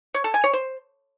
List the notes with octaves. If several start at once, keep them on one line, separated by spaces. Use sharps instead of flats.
C#5
A4
G#5
C#5
C5